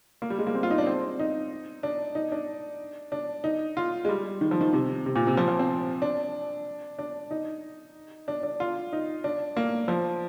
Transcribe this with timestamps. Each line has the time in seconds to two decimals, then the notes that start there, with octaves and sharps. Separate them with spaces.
0.22 A#3
0.30 G3
0.39 G#3
0.47 A#3
0.55 C4
0.63 F4
0.70 D#4
0.78 D4
0.87 C4
1.20 D#4
1.83 D4
2.15 D#4
2.32 D4
3.12 D4
3.44 D#4
3.77 F4
4.05 G#3
4.09 G3
4.41 D#3
4.51 F3
4.61 D#3
4.73 C3
5.06 C3
5.16 A#2
5.27 C3
5.37 F3
5.48 F3
5.59 C4
6.02 D4
6.99 D4
7.31 D#4
8.28 D4
8.43 D4
8.60 F4
8.93 D#4
9.24 D4
9.57 A#3
9.88 F3